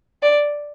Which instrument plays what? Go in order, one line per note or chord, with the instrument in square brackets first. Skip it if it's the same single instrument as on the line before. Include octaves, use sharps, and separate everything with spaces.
[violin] D5